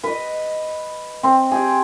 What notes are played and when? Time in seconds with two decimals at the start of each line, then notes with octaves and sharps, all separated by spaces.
0.03 B4 D#5
1.23 C4
1.51 G4 G#4